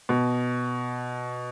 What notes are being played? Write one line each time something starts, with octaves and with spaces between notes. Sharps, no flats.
B2